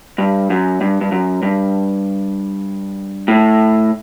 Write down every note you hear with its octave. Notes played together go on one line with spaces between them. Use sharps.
G2
F#2
G2
G2
F#2
G2
A2